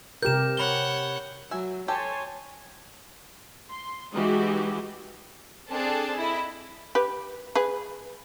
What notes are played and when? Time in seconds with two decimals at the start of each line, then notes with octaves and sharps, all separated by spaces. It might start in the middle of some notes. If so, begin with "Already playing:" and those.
0.23 C3 G4 A#4 G6 E7
0.57 C#5 F#5 B5 G7
1.51 F#3 E5 G#5
1.88 G4 A4 C#5 G#5 A5 C6
3.70 C6
4.13 E3 G#3 D#4 F#4 G4 D#5
5.70 C4 D4 G#4 A4 D5 A5
6.17 E4 D#5
6.95 G4 B4
7.55 G#4 B4